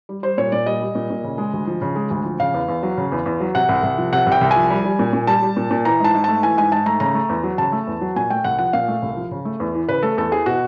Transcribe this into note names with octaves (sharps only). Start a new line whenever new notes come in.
G3
G3 C5
A#2 C#5
A#2 D5
G3 D#5
G3
A#2
A#2
C#3
G#3
D2
F3
C#3
G#3
D2
F3
C#3 F5
E2
E2
F#3
C#3
E2
E2
F#3
C3 F#5
C2
C2
F3
C3 F#5
C2
G5
C2
G#5
F3
G3
G3
A#2
A#2
G3 A5
G3
A#2
A#2
E3 A#5
G#2 A5
G#2
A3 A5
E3 G#5
G#2 G#5
G#2 A5
A3 A#5
C#3 A#5
A3
E2
F#3
C#3 A5
A3
E2
F#3
A#2 G#5
A3 G5
C2 F#5
F3 F#5
A#2 F5
A3
C2
F3
C#3
A3
E2
E3
C#3 B4
A3 A4
E2 A4
E3 G#4
B2 F#4